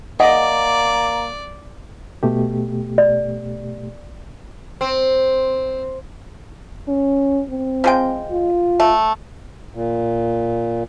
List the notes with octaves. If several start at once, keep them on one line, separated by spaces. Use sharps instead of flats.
A#3 D5 D#5 F#5 G#5
B2 A3 G4
D5
C4
C#4
C4
F3 G#3 G5
F4
A3
A#2